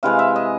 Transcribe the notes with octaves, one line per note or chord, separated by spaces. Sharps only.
C3 E3 G#3 F5
E5
D#5